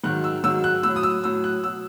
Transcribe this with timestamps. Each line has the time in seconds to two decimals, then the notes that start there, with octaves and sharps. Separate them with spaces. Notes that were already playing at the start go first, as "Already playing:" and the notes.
0.04 G#2 D#3 F#3 F#6
0.24 E6
0.44 G#2 D#3 F#3 E6
0.64 F#6
0.83 A2 F#3 E6
0.96 D#6
1.03 E6
1.24 A2 F#3 E6
1.44 F#6
1.64 B2 F#3 E6